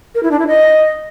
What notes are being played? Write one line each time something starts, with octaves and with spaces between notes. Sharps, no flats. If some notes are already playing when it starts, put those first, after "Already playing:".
A#4
E4
D4
E4
D#5